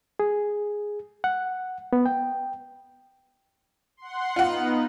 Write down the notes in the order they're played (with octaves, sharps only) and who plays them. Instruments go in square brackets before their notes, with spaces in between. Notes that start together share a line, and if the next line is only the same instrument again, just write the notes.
[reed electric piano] G#4
F#5
B3
G5
[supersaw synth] F#5 C6
[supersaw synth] B3 D#4 [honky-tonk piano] F4 F#5